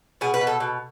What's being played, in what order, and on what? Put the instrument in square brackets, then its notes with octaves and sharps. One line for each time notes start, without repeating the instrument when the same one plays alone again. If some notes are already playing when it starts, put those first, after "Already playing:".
[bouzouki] B2 G#4
B4
B2
A4
B2